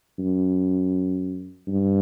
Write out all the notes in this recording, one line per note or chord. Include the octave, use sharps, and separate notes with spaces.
F#2
G2